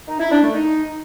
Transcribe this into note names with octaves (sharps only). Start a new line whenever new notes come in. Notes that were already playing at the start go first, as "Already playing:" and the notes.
D#4
E4
D4
A3
D#4